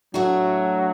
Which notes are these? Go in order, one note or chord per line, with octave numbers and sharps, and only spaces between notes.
A2 F#3 A3 D4 F#4